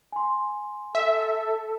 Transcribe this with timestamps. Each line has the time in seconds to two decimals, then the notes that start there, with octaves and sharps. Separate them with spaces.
0.12 G#5 C6
0.95 A4 E5